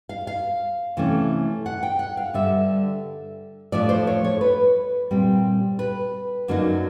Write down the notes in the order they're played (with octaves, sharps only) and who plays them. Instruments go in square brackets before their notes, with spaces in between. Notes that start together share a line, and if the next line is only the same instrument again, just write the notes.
[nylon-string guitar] F5
F5
C3 E3 A3 C#4
F#5
G5
F#5
F5
G2 D3 G3 E5
A2 F3 A3 D4 D5
C5
C#5
C#5
B4
A#2 G3 C4
B4
F#2 D3 F#3 A#3 D#4